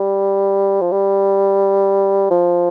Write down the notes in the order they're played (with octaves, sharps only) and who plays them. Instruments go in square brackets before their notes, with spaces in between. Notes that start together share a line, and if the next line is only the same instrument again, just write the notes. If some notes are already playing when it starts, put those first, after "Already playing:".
Already playing: [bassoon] G3
F3
G3
F3